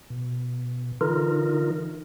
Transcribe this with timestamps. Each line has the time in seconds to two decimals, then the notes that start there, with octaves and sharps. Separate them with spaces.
0.10 B2
1.01 D3 E3 D#4 F4 A#4